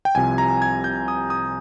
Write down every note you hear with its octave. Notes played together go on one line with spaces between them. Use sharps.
G5
C2 C3 F3 G#5
A#5
G#6
G6
D#6
D#6